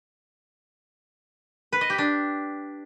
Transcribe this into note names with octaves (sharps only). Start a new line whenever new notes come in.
B4
D#5
G4
D4